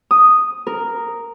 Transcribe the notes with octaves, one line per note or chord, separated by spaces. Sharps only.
D#6
A#4